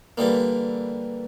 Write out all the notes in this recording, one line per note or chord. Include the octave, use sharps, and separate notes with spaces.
D3 E3 G3 A#3